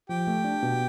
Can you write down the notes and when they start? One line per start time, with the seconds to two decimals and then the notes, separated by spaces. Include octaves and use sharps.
0.09 F3 G4
0.27 A3
0.44 D4
0.63 B2